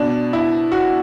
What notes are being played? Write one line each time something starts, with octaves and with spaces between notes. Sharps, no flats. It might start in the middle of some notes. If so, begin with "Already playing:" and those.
Already playing: B2 D4
E4
F#4